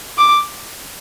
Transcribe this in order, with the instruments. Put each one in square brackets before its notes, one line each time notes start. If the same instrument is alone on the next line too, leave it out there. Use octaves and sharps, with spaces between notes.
[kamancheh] D6